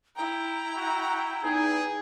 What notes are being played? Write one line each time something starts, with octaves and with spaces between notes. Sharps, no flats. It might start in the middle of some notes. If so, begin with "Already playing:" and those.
E4 G5 A#5
F#4
E2 D#4 G#4